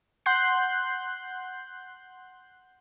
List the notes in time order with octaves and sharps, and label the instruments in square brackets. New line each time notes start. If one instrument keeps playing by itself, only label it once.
[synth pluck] F#5 C6 F#6 G6 C7